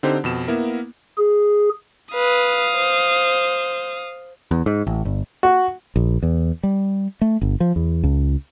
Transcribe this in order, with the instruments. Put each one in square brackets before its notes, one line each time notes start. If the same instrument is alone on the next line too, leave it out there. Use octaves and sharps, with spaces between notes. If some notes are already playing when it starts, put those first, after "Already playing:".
[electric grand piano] D3 C4 D#4 G4 C5
F2 B2 E7
A#3 B3 E4 A#4
[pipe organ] G#4
[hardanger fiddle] B4 [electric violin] F5 D#6
[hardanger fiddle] C5
[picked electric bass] E2
G#2
A1
G1
[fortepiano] F#4
[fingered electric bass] A#1
E2
G3
A3
G1
F3
E2
C#2